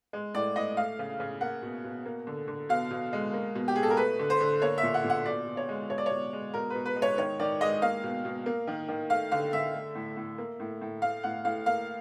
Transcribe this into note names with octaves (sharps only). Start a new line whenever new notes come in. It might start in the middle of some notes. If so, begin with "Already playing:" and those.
G#3
A2 D5
A2 D#5
A3 F5
C#3
C#3
A#3 F#5
B2
B2
A#3
D3
D3
B2 F5
B2
G#3
A#3
B2
G4
B2 G#4
A4
A#4
A3 B4
D3
C5
D3
A#3 C#5
E5
A#2
F#5
A#2
F#5
B2 D5
B2
C#5
G#3
B2 C#5
D5
B2 C#5
G#3
B2 A#4
B2 B4
B4
G#3
C#5
D#3 C#5
D#3 D5
G#3 D#5
A#3 F5
B2
B2
A#3
D#3
D#3
A3 F5
D3 F5
D3 E5
A3
A2
A2
A#3
A2
A2
A3 F5
A2 F#5
A2 F5
A#3 F5